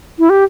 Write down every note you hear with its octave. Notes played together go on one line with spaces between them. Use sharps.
E4
G4